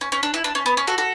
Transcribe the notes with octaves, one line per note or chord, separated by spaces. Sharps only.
C#4
C#4
D4
E4
D4
C#4
B3
C#4
F#4 A4
F#4 A4